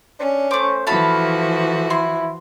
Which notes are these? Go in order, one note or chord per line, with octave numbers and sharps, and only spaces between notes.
C#4 D4
A3 C5 D6
E3 F3 A3 F#4 F5 A5 B5
E4 C6